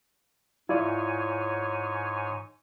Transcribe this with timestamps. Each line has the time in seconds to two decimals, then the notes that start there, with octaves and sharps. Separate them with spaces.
0.69 G#2 E4 F4 C#5 D5 G#5